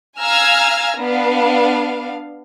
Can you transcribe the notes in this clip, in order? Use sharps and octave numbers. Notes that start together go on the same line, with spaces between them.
F5 G#5 A#5 E6 F6 G#6
B3 D4 F5